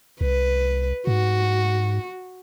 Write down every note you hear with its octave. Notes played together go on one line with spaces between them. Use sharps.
C2 B4
G#2 F#4